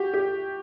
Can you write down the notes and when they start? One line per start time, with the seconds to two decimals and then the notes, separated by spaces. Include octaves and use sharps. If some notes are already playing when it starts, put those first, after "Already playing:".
Already playing: F#4 G4
0.14 G4